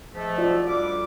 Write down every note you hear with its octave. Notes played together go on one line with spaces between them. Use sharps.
G#2 F3 A3
F4 F#4 D5
D3 G3 D6